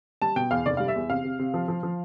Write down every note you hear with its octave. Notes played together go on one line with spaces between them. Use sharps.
G3 A5
B2 G5
E2 F5
F1 D5
G3 F5
E5
E2
C3 F5
C3
C3
F3
F3
F3